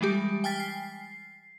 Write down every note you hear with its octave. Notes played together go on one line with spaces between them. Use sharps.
E3 G3 G#3 G4
G5 G#5 F6 A6 B6
C7